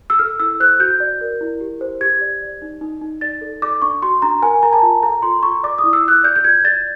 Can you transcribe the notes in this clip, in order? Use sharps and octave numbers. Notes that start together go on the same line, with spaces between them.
E6
A4 F6
E4 E6
C5 F#6
F#4 G6
D5
A#4
E4
G4
C5
G4 G#6
D5
D5
D#4
D#4
D#4
D5 A6
A4
D5 D6
D4 C#6
F#4 C6
D4 A#5
A#4 G#5
A#4 A#5
A5
F4
A4 A#5
F4 C6
F4 C#6
D5 D6
D#6
E4
E6
D5 F#6
D5 G6
G6
F4 G#6
D5 A6